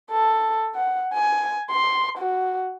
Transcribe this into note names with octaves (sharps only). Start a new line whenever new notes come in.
A4
F#5
G#5
C6
F#4